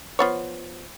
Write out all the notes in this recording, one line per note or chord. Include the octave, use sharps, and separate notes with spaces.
F3 B3 C#5